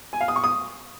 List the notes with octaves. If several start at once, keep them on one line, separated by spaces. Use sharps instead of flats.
G#5
F5
D#6
C#6
D#6